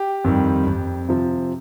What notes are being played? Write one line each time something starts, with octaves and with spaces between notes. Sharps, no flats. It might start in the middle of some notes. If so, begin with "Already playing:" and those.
Already playing: G4
F2 D#3 G3
F2
C3 F3